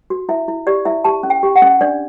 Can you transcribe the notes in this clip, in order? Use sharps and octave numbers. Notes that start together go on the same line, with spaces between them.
F#4
E4 E5
E4
G4 D5
E4 E5
G4 A5
C#4
G5
G4
F#5
C#4
D4 D5